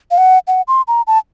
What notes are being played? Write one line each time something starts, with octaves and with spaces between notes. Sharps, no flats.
F5
F#5
F#5
C6
A#5
A5